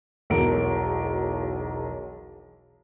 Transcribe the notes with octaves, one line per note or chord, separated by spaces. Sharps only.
E1 B1 E2 A#4 D7